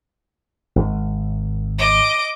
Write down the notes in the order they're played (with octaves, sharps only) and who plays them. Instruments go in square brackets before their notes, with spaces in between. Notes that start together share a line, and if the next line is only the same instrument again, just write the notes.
[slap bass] G#1
[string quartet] D#5 D6